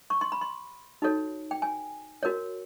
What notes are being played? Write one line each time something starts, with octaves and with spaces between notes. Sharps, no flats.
C#6
C6
B5
C6
D#4 F#4 A4 C#5
G5
G#5
F#4 A#4 C#5